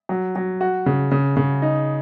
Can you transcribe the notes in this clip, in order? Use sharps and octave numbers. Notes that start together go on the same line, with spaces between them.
F#3
F#3
F#4
C#3
C#3
C#3
D#4